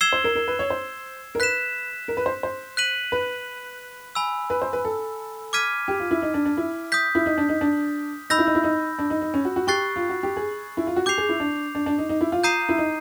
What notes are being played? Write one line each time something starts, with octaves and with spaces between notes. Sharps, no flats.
E6 G#6 C7 E7 G7
C5
A#4
A#4
B4
C#5
C5
A#4
B4 F#6 B6 E7
A#4
B4
C5
C5
F#6 B6 D#7 F#7
B4
G#5 B5 E6
B4
C5
B4
A4
D6 F6 G#6 B6 D#7
G4
F4
E4
D#4
D4
D4
E4
D#6 G6 B6
E4
D#4
D4
D#4
D4
D#4 B5 E6 G6 A#6
E4
D#4
E4
D#4
D4
D#4
D#4
C#4
F#4
F#4
G4 C#6 F#6 A6 C7
F4
F#4
G4
G#4
E4
F4
F#4
G4 D6 G6 C7 F7
G#4
E4
D4
D4
D4
D#4
D#4
E4
F4
A#5 D#6 G6 C7 D#7
E4
D#4